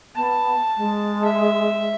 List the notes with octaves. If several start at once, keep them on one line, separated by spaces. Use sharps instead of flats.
B3 A5
G#3
E5